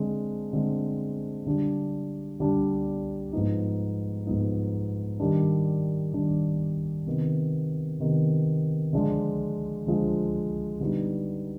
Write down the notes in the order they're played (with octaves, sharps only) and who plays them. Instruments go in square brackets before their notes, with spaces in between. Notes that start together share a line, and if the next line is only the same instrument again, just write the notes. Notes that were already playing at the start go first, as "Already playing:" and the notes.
Already playing: [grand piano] D3 G#3 C4
D3 G#3 C4
D3 G3 D4
D3 G3 D4
G#2 F3 B3 D#4
G#2 F3 B3 D#4
D#3 G3 D4
D#3 G3 D4
C3 D#3 B3
C3 D#3 B3
D3 F3 G#3 D4 F4
D3 F3 G#3 D4 F4
D3 G3 B3 D#4